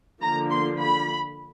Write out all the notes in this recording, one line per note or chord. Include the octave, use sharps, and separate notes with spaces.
D3 F3 A#3 A#5
C6
B5